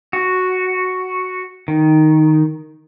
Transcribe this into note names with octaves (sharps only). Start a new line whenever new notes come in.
F#4
D#3